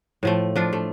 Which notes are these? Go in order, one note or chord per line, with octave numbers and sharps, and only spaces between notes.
A2 F3 A3
F3 D4 F4
A3